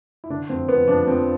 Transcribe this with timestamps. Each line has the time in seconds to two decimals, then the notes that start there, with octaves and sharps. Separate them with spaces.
0.24 E4
0.30 D3 D4
0.49 F2 C4
0.68 F3 B3
0.88 F3 D4
1.07 F2 C4